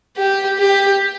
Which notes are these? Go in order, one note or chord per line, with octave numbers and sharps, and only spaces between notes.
G4
G4